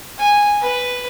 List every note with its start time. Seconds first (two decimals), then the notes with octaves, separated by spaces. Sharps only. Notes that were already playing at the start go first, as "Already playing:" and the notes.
0.18 G#5
0.61 B4